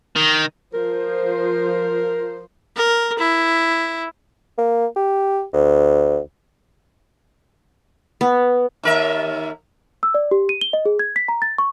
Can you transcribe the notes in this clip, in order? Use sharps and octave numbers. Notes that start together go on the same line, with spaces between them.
D#3
F3 A#4 C5
A#4
E4
A#3
G4
D2
B3
D#2 A#4 E5
E6
D5
G4
D#7
G7
D#5
G#4
G#6
B6
A#5
A6
C#6